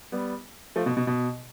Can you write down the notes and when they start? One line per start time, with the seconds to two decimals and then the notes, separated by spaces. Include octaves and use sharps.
0.12 G3 B3
0.76 F3 A3
0.86 B2
0.97 B2
1.07 B2